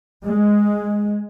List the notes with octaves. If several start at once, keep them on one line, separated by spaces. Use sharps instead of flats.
G#3